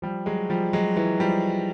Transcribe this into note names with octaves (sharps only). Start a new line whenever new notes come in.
F3 G3
F#3 G#3
F3 G3
F#3 G#3
E3 F#3
F3 G3